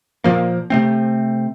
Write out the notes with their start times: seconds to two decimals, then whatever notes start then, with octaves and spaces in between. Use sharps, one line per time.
0.24 A#2 F3 A#3
0.70 C3 A3 C4